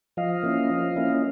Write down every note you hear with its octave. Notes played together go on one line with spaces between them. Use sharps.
F3 D#5 F5
A#3 C#4 E4
F3
A#3 C#4 E4